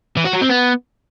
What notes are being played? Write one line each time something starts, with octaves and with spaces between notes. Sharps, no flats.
E3
F#4
F#3
C4
B3